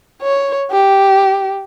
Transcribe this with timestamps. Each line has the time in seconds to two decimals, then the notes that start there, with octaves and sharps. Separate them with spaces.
0.22 C#5
0.71 G4